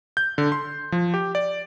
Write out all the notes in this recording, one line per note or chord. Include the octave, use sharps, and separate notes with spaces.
G6
D3
C6
F3
G4
D5